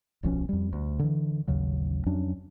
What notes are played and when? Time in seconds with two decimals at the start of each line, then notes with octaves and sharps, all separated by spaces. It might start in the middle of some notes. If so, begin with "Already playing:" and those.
0.23 D1 B1 F3 C#4
0.49 F2 G3
0.73 D2
0.99 D3 E3
1.48 A1 D#2 C#3 F#3
2.06 F2 F#3 C#4 D4